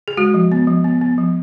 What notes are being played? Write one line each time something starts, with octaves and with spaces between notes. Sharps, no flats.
G#4
G#3 F#4
F3
B3
F3
B3
B3
F3